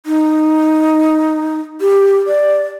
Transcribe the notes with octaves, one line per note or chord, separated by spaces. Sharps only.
D#4
G4
D5